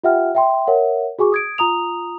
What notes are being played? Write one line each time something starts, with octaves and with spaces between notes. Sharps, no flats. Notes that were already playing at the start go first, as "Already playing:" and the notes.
F4 G4 E5 F#5 G5 F6
E5 G5 C6
A#4 C#5 E5 F#5
F#4 G#4 G#5 C#6 D6
D#6 G#6 D7
F4 A#5 D#6 F7